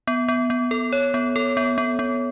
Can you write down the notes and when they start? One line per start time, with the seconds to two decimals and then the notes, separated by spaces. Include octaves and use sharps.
0.07 B3
0.29 B3
0.50 B3
0.71 A4
0.93 C#5
1.14 B3
1.36 A4
1.57 B3
1.78 B3
1.99 B3